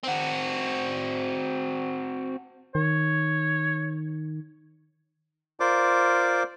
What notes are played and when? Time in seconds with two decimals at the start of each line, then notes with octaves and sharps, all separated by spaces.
0.04 C4 F#4
2.75 D#3 C#5
5.60 F4 A#4 C5 D5 D6